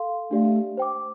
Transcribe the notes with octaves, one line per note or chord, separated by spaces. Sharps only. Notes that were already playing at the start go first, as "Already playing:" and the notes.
Already playing: A4 F5 C6
A3 D4 G4 D5 F5
C5 G5 D6